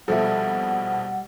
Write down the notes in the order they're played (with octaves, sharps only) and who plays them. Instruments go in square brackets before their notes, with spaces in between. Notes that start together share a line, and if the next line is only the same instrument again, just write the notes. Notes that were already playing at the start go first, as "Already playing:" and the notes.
[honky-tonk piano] A#1 B2 F3 [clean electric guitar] G3 [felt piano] A4 E5 [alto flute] F#5